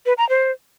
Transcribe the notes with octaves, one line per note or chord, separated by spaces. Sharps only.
B4
A#5
C5